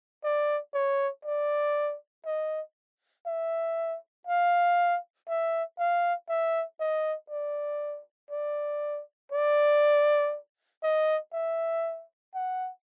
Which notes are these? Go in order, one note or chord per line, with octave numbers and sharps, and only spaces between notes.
D5
C#5
D5
D#5
E5
F5
E5
F5
E5
D#5
D5
D5
D5
D#5
E5
F#5